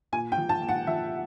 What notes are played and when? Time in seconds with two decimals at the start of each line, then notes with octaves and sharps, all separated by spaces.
0.12 A#2 G#5
0.32 G5
0.37 F3
0.49 A5
0.62 A#2
0.69 F#5
0.87 F3 E5